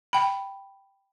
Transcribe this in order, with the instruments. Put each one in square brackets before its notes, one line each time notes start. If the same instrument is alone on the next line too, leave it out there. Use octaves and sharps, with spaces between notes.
[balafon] G5 B5